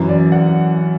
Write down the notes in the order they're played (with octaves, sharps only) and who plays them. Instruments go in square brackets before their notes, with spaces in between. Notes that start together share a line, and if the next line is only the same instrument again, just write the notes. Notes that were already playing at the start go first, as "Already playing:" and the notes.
Already playing: [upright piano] F#2 E3
D5
F#5